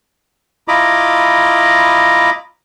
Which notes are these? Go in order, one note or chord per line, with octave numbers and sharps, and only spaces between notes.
E4 F4 D#5 A#5 B5 D6